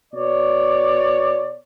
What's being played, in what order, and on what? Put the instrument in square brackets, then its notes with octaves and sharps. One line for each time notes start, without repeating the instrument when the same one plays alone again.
[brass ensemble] B2 C#5 D5